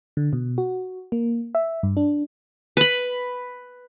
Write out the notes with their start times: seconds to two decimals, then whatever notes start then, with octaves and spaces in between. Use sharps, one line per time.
0.17 D3
0.33 B2
0.58 F#4
1.12 A#3
1.55 E5
1.83 G2
1.97 D4
2.77 B4 B5